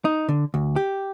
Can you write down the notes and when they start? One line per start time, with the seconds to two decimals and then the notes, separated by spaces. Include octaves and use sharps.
0.05 D#4
0.29 D3
0.54 D2
0.76 G4